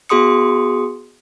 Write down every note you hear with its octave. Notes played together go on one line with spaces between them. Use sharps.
B3 F#4 G#4 C6 D#6 C#7